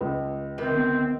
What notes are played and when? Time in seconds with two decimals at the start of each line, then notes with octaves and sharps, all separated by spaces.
0.01 C#2 B4
0.58 C3 D#3 C4 B4
0.71 D3 B3